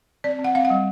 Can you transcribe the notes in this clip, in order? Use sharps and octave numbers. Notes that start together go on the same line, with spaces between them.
C4 D5
C4
F#5
C4 F5
F#5
G3